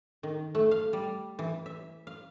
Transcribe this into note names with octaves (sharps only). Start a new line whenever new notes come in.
D#3
A3
F5
G3
E3
E5
F5